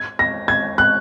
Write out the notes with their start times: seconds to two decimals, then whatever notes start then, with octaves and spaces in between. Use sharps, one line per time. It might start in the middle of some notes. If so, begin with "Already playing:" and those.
Already playing: G#6
0.19 A#6
0.48 G#6
0.78 F#6